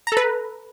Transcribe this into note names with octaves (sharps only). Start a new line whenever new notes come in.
A4 B4 A#5